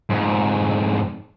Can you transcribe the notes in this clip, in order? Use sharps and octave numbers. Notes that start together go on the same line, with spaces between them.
F2 G#2